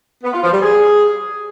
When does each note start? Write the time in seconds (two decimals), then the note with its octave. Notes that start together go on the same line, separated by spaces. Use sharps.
0.24 B3
0.33 F4
0.43 F3
0.53 G3
0.63 G#4